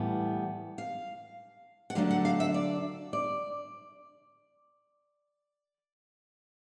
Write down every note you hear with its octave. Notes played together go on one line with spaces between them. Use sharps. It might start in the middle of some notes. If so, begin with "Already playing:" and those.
Already playing: A2 E3 G3 B3
F5
F#5
D3 F#3 A3 D4 F5
F#5
F5
E5
D5
D5